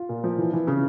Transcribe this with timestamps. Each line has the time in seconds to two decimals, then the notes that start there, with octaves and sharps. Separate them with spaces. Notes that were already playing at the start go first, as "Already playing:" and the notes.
Already playing: F4
0.09 A#2
0.24 F3
0.38 E3
0.53 E3
0.67 C#3